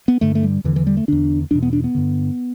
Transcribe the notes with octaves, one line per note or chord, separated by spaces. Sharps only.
B3
G2 D3 A3
A3
G3
E2 D3 E3
E3
G3
A3
E2 D3 D4
E2 B2 D4
B3
D4
B3
G2 D3